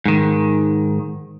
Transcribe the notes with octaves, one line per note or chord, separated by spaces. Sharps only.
G#2 D#3